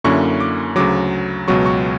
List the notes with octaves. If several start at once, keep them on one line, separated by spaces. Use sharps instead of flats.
F#2 D3 A#3 C#4 E4 C#6
D6
D2 C#3 F#3 D6
C#2 B2 F#3 C#6
C#6